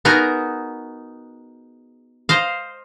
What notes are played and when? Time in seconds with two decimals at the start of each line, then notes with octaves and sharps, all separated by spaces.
0.05 B3 D#4 F#4 G#4 A#4
2.29 C5 D#5 F5